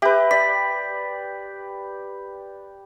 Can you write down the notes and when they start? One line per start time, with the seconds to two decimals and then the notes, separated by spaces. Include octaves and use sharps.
0.02 G4 B4 E5
0.31 D5 B6